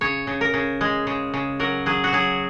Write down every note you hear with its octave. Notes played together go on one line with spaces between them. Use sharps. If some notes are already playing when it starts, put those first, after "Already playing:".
C#3 C#5
C#3
A#4
C#3
G#3
C#3
C#3
F#3 A#4
F#3 G#4
F#4
F#3 G#4